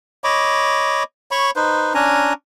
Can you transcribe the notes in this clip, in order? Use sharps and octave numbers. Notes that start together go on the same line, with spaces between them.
C#5 D#5 B5 D6
C#5 B5 C#6
D#4 B4 C5
C#4 D4 G#5 A#5